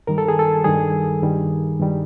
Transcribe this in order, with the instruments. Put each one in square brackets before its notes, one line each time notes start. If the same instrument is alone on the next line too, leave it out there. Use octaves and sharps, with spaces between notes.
[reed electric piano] G2 D#3 G3 A#4
A4
G#4
A4
G2 D#3 G3 G#4
G2 D#3 G3
G2 D#3 G3